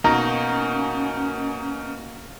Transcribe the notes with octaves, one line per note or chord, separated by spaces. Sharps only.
B2 A#3 C#4 D#4 F#4 A#5